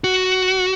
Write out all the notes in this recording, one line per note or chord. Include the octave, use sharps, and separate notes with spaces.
F#4